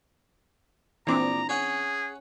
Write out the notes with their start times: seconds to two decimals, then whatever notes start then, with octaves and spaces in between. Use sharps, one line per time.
1.07 A#1 E3 C4 D4 A#5 D6
1.49 C#4 G#4 F#5